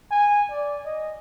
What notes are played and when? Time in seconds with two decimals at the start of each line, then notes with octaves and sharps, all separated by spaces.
0.11 G#5
0.51 D5
0.85 D#5